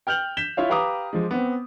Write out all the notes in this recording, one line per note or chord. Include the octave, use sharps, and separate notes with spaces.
G5 F6 G6 F7 F#7
G6 B6 E7 G7
E4 F4 C#5 F5
G4 B4 F5 A#5 D6 D#6
F3 G#3
B3 C4